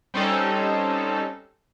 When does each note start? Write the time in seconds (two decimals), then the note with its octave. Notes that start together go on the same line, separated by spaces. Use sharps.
0.14 G3 C4 C#4 D#4 A4